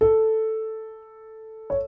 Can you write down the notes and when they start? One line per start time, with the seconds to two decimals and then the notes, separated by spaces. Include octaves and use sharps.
0.01 A4
1.70 C#5